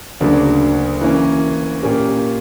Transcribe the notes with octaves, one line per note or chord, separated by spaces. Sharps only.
D2 C#3 F#3 A#3 D4
E3 A#3 C#4
A#2 A#3 C#4 G4